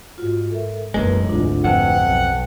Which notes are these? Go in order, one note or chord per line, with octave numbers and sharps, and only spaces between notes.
G#2 F4 F#4
A4 A#4 E5
E1 B1 F#2 G#3 A#3 B4
G#1 D2 D4 E4 F4
F2 B4 F#5 G5 A5
B1